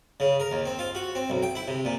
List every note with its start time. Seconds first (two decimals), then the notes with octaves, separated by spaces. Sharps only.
0.20 C#3
0.40 A#4
0.52 D#2
0.66 C4
0.79 F4
0.95 F#4
1.15 C4
1.30 B1
1.43 G5
1.55 E4
1.68 C3
1.85 A#2